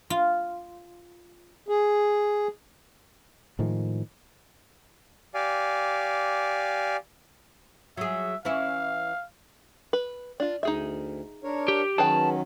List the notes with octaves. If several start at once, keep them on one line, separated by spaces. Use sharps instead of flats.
F4
G#4
A2 D#3 F3 G#3
G4 D5 F5 G#5
F#3 G#4 E5
E3 C#4 E4 F5
B4
D4 F4
D2 D#4 G#4 E5
D4 A#4 C#5
G4
D#3 F#3 C#4 G#4 B4 G5 A5